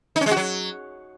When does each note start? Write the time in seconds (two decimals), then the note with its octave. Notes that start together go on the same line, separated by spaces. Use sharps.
0.16 D#4
0.21 C#4
0.26 G#3
0.31 F#4
0.36 F#3